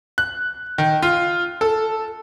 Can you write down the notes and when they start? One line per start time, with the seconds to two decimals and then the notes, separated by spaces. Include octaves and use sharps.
0.18 F#6
0.78 D#3
1.02 F4
1.61 A4